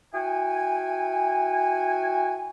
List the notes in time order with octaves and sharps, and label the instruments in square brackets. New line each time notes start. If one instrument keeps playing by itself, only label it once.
[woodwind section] E4 F#4 G5 G#5